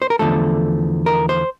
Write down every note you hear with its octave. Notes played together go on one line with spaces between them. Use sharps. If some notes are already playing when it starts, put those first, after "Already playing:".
C5
A#4
E2 D3 F3 A3 A4
A#4
C5